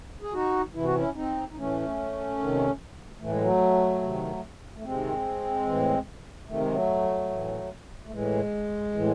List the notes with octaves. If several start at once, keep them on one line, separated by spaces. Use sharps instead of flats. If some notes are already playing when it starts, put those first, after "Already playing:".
G#4
D#4 F#4
C3 E3 E4
F#4
C#4 E4
C4 D#4
D#4
A2 E3 A3 C#4
C3 D#3
A2 E3 A3
G#3
F#3 A3
C3 D#3
A3
C3 D#3 G#3 C4
A2 E3
C3 D#3 A3
G#3
F#3 A3
A2 E3
A3
A2 E3 G#3
A2 E3